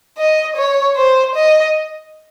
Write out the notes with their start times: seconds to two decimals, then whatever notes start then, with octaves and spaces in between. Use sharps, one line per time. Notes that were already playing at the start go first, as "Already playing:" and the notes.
0.18 D#5
0.57 C#5
0.96 C5
1.35 D#5